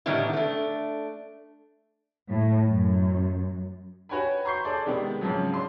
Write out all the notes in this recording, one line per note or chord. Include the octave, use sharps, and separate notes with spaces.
A2 D#3 G3 B3 D4 E4
A3 D4
A2
F#2
F#4 B4 C#5 G5 G#5 B5
A#5 C6 C#6 G6 C7
G#4 A4 D5
C3 D#3 G#3 B3
G#2 C#3 F3 F#3
D4 C6